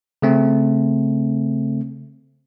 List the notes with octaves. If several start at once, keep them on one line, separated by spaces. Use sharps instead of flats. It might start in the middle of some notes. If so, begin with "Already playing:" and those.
C#3 A3 C4